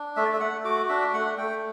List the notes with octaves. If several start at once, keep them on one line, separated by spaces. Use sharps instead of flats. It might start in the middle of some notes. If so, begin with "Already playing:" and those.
Already playing: D4
A3 E5
D5
E5
A3 F#5
F#4 D6
D4 E5
A3 F#5
A3 G5